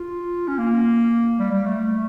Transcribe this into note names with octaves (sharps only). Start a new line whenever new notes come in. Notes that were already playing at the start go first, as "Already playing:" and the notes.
Already playing: F4
C#4
A#3
G3
G3
A3